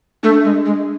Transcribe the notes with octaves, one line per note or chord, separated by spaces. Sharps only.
A3 D4
G#3
G#3